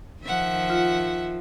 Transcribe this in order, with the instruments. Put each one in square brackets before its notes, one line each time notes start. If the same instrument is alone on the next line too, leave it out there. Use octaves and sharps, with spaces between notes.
[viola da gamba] D#3 F3 [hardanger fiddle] E5 F#5
[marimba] F4